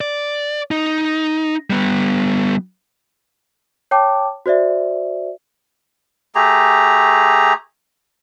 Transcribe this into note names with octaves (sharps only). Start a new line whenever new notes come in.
D5
D#4
G3 B3
C#5 G5 A5 D6
F#4 C5 D5 E5
A3 G4 G#4 A#5